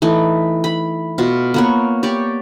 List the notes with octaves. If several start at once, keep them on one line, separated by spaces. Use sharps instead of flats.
E3 A3 D#4
B5
B2 F4
A#3 B3 C#5
G4 C#5 D5